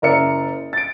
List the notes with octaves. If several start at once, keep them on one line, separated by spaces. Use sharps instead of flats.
F#1 E4 A#4 D5 E5 C#7
A6 D7